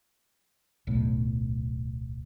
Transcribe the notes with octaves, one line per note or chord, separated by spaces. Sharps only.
D1 B1 A2